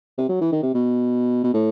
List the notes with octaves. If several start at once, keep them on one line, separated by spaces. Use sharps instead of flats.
C3
F#3
E3
D#3
C3
B2
B2
A2